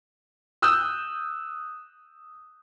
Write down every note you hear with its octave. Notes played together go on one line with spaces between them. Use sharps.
D#6 E6 F#6 G6